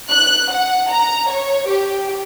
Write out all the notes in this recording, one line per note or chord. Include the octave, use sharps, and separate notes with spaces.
F#6
F#5
A#5
C#5
G4